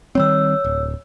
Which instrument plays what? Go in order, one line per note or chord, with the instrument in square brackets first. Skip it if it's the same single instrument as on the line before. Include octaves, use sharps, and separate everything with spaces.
[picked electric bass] D#3 G3 C4 [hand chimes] C#5 E6
[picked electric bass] D1